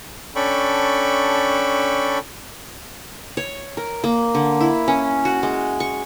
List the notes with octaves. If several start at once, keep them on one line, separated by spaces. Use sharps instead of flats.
C#4 D4 A4 G5 B5 C#6
C#5
A#4
A#3
D3
E4
C#4
F#4
G#3
C#6